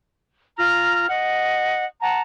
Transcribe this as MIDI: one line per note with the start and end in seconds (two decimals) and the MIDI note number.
0.58 1.07 65
0.58 1.07 82
0.58 1.07 89
1.08 1.85 75
1.08 1.85 78
2.01 2.22 78
2.01 2.22 81
2.01 2.22 82